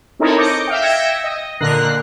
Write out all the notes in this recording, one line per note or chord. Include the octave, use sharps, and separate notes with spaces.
C4 D#4 E4 A4 A#4 C#5
D#5 D6 G6 A#6 C#7
E5 F5 G5
E5 G5 G#6 A#6 C#7 E7
D#5
A#2 D3 A#4 F#6 A#6 C7